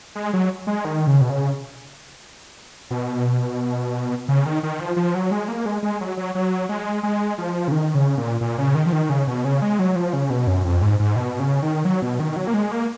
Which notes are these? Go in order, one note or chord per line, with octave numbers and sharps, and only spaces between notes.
G#3
F#3
G#3
D#3
C#3
B2
C#3
B2
C#3
D#3
D#3
F3
F3
F#3
G#3
A#3
G#3
G#3
F#3
F#3
F#3
G#3
G#3
F3
C#3
D#3
C#3
A#2
A#2
C#3
D#3
F3
D#3
C#3
B2
C#3
G#3
F#3
F3
C#3
B2
F#2
F2
G#2
G#2
B2
C#3
D#3
F#3
B2
D#3
F#3
A#3
G#3
A#3